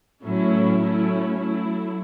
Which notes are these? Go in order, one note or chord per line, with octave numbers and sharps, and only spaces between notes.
A2 F#3 A3 C#4 E4
F#3 A3 C#4 E4
F#3 A3 E4